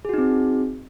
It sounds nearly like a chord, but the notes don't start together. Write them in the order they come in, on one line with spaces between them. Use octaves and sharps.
G#4 F#4 D#4 C4